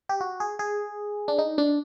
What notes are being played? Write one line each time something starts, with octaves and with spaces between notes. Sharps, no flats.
G4
F#4
G#4
G#4
D4
D#4
D4